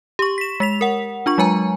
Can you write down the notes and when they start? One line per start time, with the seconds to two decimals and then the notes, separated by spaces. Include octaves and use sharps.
0.19 G4 C#6
0.38 B6 E7
0.60 G#3 B6 F7
0.81 A#4 F#5
1.26 D4 F4 C#6
1.38 F#3 G#3 G#5 A#5